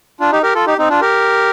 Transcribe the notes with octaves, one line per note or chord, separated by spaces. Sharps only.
D4 F4
D#4 G4
G4 A#4
F4 A4
D#4 G4
C4 D#4
D4 F4
G4 A#4